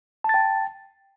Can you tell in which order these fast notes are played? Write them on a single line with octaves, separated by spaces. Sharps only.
A5 A6 G5